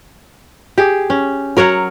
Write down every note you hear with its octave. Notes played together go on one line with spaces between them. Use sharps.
G4 G#4
C#4
F#3 A#4 C#5 F#5